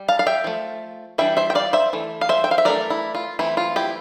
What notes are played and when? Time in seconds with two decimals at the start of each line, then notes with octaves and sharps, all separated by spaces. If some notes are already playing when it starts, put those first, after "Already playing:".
Already playing: G3
0.08 F5 A5
0.19 F5
0.27 E5 G5
0.44 F3 A3
1.18 E3 G3 D4 E5 G5
1.37 C5 E5
1.50 G5
1.55 D5 F5
1.73 C5 E5
1.93 E3 A3
2.21 F5
2.29 C5 E5
2.44 G5
2.51 F5
2.58 E5
2.65 E3 A3 D4 A#4 D5
2.90 E4
3.15 F4
3.39 E3 A3 C4 E4
3.57 F4
3.76 E4 G4